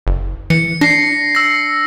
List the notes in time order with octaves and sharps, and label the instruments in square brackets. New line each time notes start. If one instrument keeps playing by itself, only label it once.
[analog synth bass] F#1
[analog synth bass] E3 [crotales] C#7
[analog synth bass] D4 [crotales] A#6 C7
[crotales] E6 A#6